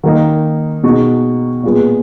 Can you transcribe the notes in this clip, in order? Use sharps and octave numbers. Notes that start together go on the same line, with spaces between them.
D#3 A#3 D#4
B2 G#3 D#4 F#4
A#2 G#3 B3